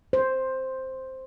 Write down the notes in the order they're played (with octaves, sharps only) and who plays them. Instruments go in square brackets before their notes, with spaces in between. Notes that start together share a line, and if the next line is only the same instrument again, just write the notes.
[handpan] C5